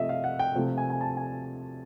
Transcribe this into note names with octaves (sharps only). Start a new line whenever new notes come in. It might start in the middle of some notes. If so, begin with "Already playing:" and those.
Already playing: C3 F3 A3 D#5 E5
F5
F#5
G5
C3 F3 A3
G#5
G#5
A5
G#5